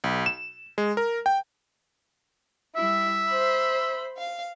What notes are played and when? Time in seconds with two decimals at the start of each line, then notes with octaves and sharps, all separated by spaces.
0.04 B1
0.26 E7
0.78 G#3
0.97 A#4
1.26 G5
2.76 G3 E4 E5
3.27 C5 B5
4.17 F5